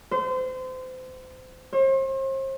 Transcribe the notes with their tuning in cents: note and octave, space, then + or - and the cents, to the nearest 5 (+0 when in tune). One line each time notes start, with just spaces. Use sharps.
C5 -30
C5 +40